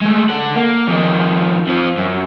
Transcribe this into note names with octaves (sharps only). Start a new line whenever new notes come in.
G#3 A3
A4 F#5
A#3
F2 D#3
F2 F3
F#2